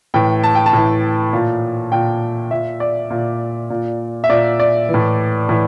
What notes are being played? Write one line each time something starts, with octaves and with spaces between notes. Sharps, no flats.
A2 E3 G5
A5
G5
A5
A2 E3
A#2
A#2 G5
A#2 E5
D5
A#2
A#2
E5
A#2 D5
D5
A2 E3
A2 E3